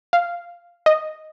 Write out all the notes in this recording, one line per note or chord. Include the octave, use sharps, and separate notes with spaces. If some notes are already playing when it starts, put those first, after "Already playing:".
F5
D#5